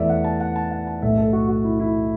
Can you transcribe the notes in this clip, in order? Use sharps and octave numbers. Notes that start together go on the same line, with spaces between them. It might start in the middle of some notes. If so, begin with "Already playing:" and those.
Already playing: E2 E3 A3 D5 E5
F#5
A5
F#5
A5
F#5
A5
B1 A2 A3 E5
A4
F#4
F#4
E4
E4